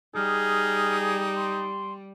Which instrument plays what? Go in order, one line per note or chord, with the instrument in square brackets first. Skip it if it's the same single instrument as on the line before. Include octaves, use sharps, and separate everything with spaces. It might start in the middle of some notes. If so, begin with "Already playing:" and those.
[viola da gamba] G3 [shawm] D#4 [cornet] G#4 [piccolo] F6
[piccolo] C6